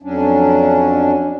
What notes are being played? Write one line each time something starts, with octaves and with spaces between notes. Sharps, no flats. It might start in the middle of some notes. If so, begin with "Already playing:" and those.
F2 F#3 C#4 D4